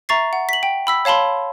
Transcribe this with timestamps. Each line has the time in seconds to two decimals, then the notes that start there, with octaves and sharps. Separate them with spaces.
0.09 E5 A#5 C#6 A6 C7
0.33 F#5
0.49 B6 F#7
0.63 G5
0.87 B5 E6 B6
1.05 C#5 F5 A5 B5 C6